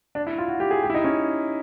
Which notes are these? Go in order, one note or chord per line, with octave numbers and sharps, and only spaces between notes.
D4
E4
F4
F#4
G4
G#4
G4
E4
D#4
C#4